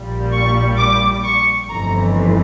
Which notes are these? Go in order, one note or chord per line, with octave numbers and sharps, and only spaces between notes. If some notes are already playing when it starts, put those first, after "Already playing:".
Already playing: A#1 A#2 G3
C#6
D6
C#6
G1 F2 E3 A3 A#5